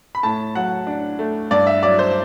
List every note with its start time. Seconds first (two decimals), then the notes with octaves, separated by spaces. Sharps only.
0.15 B5
0.23 A2 A5
0.55 F#3 F#5
0.87 D4
1.19 A3
1.51 G2 D5
1.67 E5
1.83 F#3 D5
1.99 C5